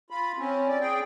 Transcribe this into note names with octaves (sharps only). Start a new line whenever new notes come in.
F4 B5
C4 C#4
D5
G#4 G5